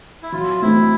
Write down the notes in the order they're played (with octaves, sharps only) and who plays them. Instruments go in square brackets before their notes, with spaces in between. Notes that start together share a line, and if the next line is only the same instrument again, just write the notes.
[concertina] E4
[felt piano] F#3 [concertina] F4
[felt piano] A3 C4 D#4 [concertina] E4